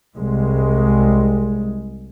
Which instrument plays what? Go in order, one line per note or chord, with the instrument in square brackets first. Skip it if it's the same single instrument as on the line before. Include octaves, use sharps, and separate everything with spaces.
[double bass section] C2 G#3